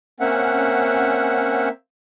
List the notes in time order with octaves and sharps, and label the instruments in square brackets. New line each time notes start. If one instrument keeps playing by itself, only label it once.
[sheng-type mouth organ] A#3 C4 E5 [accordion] C#4 F#5